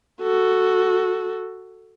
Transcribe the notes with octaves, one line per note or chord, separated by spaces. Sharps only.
F#4 A4